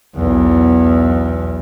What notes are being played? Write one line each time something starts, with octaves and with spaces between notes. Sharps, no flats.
B1 E2